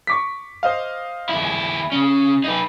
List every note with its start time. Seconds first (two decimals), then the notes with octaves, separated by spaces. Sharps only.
0.07 C#6 D6 B6
0.63 C5 D#5 F5
1.29 D#2 E4
1.45 G#5
1.92 C#3 C#4
2.44 D#4 B4